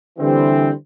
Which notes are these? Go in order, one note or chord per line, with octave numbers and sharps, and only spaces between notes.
D3 E3 G3 C4